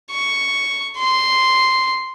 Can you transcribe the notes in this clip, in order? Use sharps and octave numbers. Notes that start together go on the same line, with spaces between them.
C#6
C6